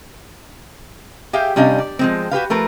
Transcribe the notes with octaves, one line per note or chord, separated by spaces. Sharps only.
G4 G#4 E5 F5 G5
C3 G3 C#4 D4 D#5 F5
D5
F3 G#3 C4
F#4 G4 B4 F5
F3 A3 A#4 B4